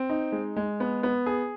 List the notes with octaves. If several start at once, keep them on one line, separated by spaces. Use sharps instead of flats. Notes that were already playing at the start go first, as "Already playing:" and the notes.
Already playing: C4
D#4
G#3
G#3
B3
B3
G#4